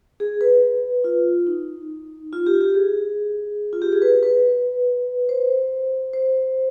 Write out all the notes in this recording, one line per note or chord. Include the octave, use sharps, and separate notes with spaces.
G#4
B4
F4
D#4
F4
G4
G4
G#4
F4
G4
G#4
B4
B4
C5
C5